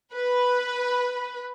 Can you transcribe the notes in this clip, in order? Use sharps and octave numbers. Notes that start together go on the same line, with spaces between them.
B4